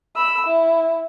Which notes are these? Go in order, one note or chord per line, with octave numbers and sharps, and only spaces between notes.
B5 E6
E4